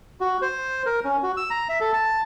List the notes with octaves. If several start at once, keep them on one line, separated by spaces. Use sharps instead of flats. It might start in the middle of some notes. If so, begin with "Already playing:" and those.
F#4
C5
A#4
C#4
F#4
E6
A#5
E5
A4
A5